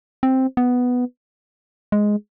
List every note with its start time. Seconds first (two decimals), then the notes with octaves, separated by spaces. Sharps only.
0.23 C4
0.57 B3
1.92 G#3